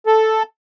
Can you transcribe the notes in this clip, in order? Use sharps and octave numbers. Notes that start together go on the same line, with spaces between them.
A4